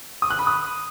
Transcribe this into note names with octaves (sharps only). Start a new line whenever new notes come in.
D#6
F#6
B5
D#6